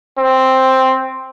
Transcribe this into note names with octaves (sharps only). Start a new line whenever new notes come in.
C4